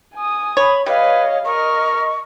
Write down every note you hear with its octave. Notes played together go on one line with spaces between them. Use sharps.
G#5 D#6
C#5 B5
G3 B4 C#5 D#5 F5
A#4 D#5 C#6 F6